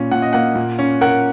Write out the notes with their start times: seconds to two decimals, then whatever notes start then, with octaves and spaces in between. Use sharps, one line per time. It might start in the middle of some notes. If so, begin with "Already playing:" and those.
Already playing: A#2 C#4
0.11 A#2 F#5
0.22 D#5
0.33 A#3 F#5
0.56 A#2
0.79 C#4
1.01 A#4 F#5